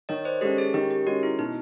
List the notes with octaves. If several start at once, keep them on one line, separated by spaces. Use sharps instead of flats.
D#3 C#5 D#5
C5 D5
G#3 C#4 G4 A4
G#4
D#3 G4
G4
G#3 C#4 F#4
E4
B2 D#4